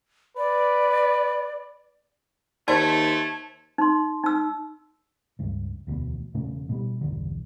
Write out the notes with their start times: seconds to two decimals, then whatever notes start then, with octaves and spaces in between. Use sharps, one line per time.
0.37 B4 D5
2.68 D#2 A3 C5 A5 G#6
3.78 D#4 C6
4.24 D#4 E6
5.39 C#2 G2
5.87 E1 D2 B2
6.34 E1 A#2 C#3 A3
6.69 B2 G3
7.01 B1 E2 G2 D3